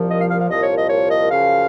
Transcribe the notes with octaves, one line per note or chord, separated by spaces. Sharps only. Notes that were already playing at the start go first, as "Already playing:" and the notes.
Already playing: C2 A#2 F3
D#5
F5
F5
F5
C2 A#2 F3 D#5
C#5
D#5
C#5
D#5
F#2 C#3 F3 F5